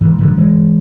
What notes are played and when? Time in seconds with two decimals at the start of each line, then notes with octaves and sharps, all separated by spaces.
0.01 G#2 E3
0.18 G#2 D3 F3
0.37 G#2 E3 G#3